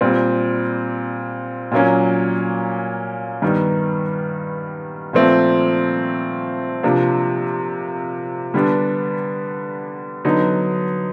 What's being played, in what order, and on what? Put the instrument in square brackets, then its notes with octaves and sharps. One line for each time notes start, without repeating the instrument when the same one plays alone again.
[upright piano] A#2 G3 C4
A#2 F#3 A#3 C#4
G2 D#3 G3 B3
A#2 F3 A3 C4
C3 F3 A#3 D4
D3 G3 B3 D4
D3 F#3 B3 D#4